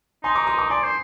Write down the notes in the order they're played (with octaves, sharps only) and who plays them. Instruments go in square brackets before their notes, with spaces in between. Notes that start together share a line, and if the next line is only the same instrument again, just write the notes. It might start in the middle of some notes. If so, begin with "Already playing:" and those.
[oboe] D#4 [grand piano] G#5 C6
[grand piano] A#5 D6
C6 D#6
A#5 D6
[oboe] D5 [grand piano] G#5 C6
[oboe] C5